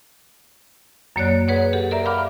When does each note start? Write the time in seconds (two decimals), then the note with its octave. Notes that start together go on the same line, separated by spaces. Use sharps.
1.16 F#2 F#3 A#3 C#5 D5 F#6
1.48 G#4 B4 C#5 F#5
1.73 G4 A4 F#5
1.91 A#4 D5 E5 A#5
2.05 F5 F#5 B5 D6 F6